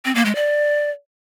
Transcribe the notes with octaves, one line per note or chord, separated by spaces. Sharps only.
C4
A#3
G#3
D5